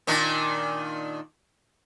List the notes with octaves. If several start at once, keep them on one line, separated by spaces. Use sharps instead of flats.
A#2 D#3 D4